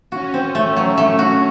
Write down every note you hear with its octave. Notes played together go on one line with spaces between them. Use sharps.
C#4 F#4
C4
A3
F#3
A3
F#4